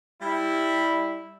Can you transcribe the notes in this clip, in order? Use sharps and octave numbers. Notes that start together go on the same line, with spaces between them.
G3 E4